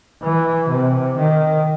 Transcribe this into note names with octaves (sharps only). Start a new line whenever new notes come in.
E3
C3
D#3